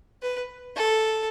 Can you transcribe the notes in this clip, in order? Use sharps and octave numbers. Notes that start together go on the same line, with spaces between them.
B4
A4